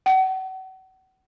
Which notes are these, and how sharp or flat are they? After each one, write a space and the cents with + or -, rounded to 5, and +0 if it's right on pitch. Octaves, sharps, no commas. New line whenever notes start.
F#5 +35